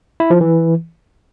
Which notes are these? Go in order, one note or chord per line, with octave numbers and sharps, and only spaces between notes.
E4
F3
E3